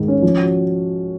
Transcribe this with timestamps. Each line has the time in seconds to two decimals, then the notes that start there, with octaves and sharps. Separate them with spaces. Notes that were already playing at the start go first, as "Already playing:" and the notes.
Already playing: G#2 D#3 G#3
0.08 C#4
0.23 F3
0.38 F#4